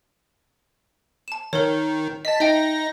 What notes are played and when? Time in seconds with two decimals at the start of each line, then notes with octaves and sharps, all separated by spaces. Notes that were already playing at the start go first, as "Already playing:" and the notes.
1.28 A5 E7
1.53 D#3 A#4 C#5
2.25 D#5 A5 B6
2.40 D#4 D#5 E5 G5 A#6